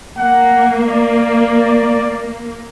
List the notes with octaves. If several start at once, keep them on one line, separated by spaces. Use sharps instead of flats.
A#3 F#5
D5